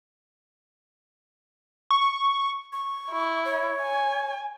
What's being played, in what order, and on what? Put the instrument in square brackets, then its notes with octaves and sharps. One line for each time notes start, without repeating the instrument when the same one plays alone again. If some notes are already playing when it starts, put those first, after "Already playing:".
[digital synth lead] C#6
[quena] C#6
[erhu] E4
[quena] C#5
[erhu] G#5